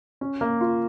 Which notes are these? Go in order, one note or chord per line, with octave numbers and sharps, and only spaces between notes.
C#4
A#3
F4